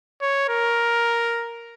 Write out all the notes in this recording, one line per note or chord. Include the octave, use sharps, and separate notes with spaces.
C#5
A#4